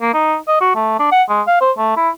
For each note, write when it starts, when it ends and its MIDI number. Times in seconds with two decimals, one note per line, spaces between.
0.02 0.11 58
0.14 0.36 63
0.48 0.58 75
0.61 0.71 66
0.75 0.94 57
1.00 1.11 62
1.12 1.23 78
1.29 1.42 56
1.47 1.59 77
1.61 1.72 72
1.78 1.96 57
1.97 2.10 64